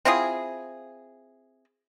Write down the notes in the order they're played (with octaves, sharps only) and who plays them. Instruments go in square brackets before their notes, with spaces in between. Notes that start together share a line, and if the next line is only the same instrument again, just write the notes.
[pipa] C4 E4 F4 G#4